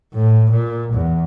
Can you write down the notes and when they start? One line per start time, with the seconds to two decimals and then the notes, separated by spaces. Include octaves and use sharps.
0.14 A2
0.51 A#2
0.93 E2